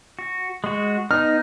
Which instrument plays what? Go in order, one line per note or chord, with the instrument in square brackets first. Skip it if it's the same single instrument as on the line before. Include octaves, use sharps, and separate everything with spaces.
[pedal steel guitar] F#4
G#3 F#4
[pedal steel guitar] B3 D#4 [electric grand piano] F6